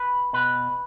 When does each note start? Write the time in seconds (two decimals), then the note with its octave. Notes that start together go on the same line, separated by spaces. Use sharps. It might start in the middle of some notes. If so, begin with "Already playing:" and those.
Already playing: B4
0.33 B2 B4